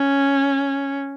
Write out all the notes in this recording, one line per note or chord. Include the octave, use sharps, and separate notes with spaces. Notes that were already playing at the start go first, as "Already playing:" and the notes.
Already playing: C#4